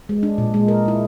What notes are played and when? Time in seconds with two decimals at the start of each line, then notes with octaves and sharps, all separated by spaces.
0.09 G#3
0.23 D4
0.38 A#2
0.54 G#3
0.68 A#4
0.88 E4